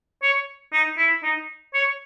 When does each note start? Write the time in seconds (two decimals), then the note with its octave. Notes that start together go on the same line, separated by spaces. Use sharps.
0.22 C#5
0.73 D#4
0.97 E4
1.23 D#4
1.74 C#5